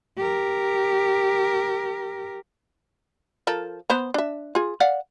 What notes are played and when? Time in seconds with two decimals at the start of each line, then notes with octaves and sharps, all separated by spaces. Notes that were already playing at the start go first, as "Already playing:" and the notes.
0.17 G4 A#4
3.47 F3 A4 A#4
3.90 B3 C5 A#5
4.14 D4 E5
4.55 F4 G#4
4.80 D5 F5 F#5